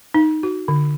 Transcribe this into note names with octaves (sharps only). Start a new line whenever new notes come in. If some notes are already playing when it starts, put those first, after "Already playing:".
D#4
F#4
D3